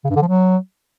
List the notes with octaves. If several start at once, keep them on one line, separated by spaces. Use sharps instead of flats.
C#3
G2
D3
F3
F#3